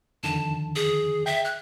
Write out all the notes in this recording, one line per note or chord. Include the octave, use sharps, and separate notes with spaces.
F2 D3 D#3 A5
G#4
E5 G5
F#6